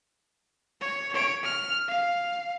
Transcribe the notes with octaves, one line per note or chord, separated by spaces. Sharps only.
C#5
C#5 D7
F6
F5